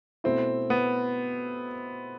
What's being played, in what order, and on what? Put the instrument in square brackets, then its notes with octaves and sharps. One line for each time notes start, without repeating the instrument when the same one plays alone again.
[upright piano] B2 A3 E4 [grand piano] C4
[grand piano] B3